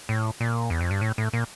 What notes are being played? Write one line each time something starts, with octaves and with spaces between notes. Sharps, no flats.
A2
A#2
E2
F2
G2
A2
A2
A#2